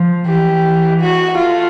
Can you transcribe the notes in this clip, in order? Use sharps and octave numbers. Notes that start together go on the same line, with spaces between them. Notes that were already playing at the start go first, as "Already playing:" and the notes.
Already playing: F3
E3 G4
F#4
A3 F4